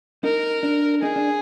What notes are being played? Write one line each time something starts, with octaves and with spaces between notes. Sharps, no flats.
D#4 A#4
D4
D#4 G#4
D4